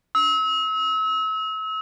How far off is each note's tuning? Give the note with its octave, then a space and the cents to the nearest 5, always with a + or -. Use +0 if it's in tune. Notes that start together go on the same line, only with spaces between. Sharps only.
E6 -35